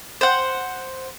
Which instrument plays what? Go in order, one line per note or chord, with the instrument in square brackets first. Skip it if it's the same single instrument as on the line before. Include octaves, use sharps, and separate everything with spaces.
[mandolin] C5 F#5